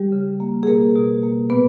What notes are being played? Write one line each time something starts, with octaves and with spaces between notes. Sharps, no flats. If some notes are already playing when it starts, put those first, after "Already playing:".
Already playing: G3 G4
C#3
A#3
G#4
B2 A#3 A#4
B2
A#3
A#2 B3 B4